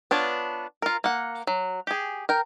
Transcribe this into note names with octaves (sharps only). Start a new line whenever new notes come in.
B3 D4 F4 C#5 A5
F4 A#4
A#3 F#5
F#3
G4 G#4
A#4 G5